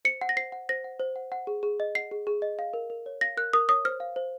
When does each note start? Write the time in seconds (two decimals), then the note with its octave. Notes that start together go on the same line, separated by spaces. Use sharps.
0.05 C5 C#7
0.21 F#5
0.29 A#6
0.37 C5 C7
0.52 F#5
0.69 C5 A#6
0.84 F#5
1.00 C5
1.16 F#5
1.32 F#5
1.47 G#4
1.63 G#4
1.80 D#5
1.95 F#5 C7
2.11 G#4
2.27 G#4
2.42 D#5
2.59 F5
2.74 A#4
2.90 A#4
3.06 C#5
3.21 F5 A#6
3.37 A#4 F#6
3.53 A#4 D#6
3.69 C#5 D#6
3.85 C5 F6
4.00 F5
4.16 C5